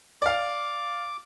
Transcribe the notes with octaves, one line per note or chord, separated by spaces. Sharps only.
D5 F5 D6